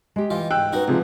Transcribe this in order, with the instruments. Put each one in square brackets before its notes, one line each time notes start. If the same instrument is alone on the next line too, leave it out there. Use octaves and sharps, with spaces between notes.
[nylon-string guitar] G#3 G4
[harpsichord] E3 F4 G4 [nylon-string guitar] D#5 G#5
[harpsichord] G#2 [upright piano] G5 E6 F#6
[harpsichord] C#4 F#4 D#5 [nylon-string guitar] D#4 B4
[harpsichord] C#2 [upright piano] C3 F3 G#3